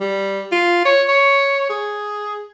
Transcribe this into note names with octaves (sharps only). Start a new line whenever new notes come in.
G3
F4
C#5
C#5
G#4